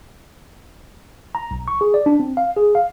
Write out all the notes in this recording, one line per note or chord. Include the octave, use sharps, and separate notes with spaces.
A#5
B1
C#6
G#4
D5
D4
C4
F5
G#4
F5